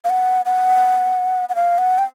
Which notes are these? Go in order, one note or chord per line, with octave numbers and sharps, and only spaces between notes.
F5
F#5
F#5
F#5
F5
F#5
G5